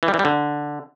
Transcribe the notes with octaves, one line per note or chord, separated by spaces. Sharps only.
E3
G3
E3
G3
D3